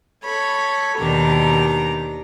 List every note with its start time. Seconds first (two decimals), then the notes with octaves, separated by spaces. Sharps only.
0.25 A4 C#5 B5
0.98 D#2 B2 D#3 D4 G4 A#5